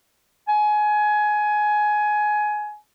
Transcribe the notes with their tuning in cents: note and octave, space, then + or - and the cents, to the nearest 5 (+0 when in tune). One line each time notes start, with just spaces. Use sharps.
G#5 +20